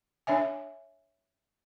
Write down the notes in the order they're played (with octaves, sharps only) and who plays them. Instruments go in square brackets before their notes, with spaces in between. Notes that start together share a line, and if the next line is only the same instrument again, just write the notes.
[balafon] D4 C#5 E5 G#5